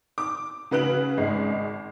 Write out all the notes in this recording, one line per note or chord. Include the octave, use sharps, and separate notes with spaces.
D6
C#3 F#4 B4 F#6 D7 F#7
G#1 G#3